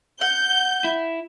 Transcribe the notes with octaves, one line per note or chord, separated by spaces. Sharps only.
F#5 G6
E4